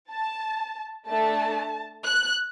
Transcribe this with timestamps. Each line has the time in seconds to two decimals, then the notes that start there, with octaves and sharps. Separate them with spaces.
0.10 A5
1.08 A3 D4 A4 A5
2.06 F#6